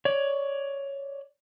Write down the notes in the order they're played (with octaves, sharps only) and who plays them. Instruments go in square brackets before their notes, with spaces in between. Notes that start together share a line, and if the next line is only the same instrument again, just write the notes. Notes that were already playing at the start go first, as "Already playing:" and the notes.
[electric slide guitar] C#5 D5